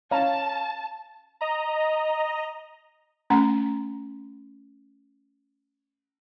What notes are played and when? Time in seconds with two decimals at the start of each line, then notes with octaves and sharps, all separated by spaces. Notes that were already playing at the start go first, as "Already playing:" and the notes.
0.11 C#4 F5 A5 A#5
1.41 D#5 A#5
3.30 A3 C#4 F#5 A#5